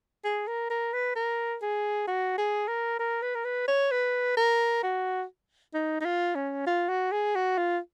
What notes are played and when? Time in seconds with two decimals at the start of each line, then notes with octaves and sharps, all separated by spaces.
0.24 G#4
0.47 A#4
0.70 A#4
0.93 B4
1.16 A#4
1.62 G#4
2.07 F#4
2.38 G#4
2.68 A#4
2.99 A#4
3.22 B4
3.35 A#4
3.45 B4
3.68 C#5
3.91 B4
4.37 A#4
4.83 F#4
5.74 D#4
6.01 D#4
6.05 F4
6.35 C#4
6.67 F4
6.89 F#4
7.12 G#4
7.35 F#4
7.58 F4